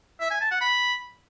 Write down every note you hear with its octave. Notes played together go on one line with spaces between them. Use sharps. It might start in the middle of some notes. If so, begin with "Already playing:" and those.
E5
G#5
A5
F#5
B5